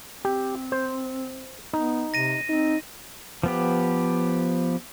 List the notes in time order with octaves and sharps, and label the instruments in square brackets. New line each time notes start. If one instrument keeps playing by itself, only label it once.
[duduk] C4 [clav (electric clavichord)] G4
[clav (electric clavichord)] C5
[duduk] B3 [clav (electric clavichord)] D#4
[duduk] C3 [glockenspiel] A#6 D#7
[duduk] C4 [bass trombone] D#4
[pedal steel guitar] F3 B3 G4